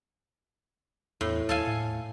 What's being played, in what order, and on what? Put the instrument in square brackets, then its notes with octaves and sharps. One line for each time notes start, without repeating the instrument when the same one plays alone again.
[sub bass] E2 [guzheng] A2
[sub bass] D#2 [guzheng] A4 F5 G#5
[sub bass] A2